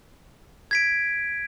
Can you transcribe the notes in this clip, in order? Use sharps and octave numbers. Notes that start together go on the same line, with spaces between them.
G#6 B6 D7